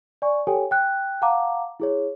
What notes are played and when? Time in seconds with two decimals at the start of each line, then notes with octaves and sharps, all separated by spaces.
0.22 D5 G#5 C#6
0.47 G4 A4 C#5 G5 G#5
0.71 G5 F#6
1.22 F5 F#5 A5 A#5 D6
1.80 E4 G#4 C#5